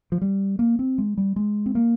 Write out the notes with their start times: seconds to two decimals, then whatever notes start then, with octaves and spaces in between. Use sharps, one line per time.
0.12 F3
0.21 G3
0.59 A#3
0.79 C4
0.98 G#3
1.17 G3
1.36 G#3
1.66 C4
1.75 A#3